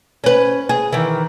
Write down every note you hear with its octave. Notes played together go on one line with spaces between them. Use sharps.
C#4 B4
G#4
D#3 E3